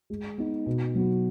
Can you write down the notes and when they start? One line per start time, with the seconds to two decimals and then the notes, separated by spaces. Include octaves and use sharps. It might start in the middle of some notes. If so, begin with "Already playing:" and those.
0.10 G#3
0.38 B3 D#4
0.66 B2
0.95 F#3 B3 F#4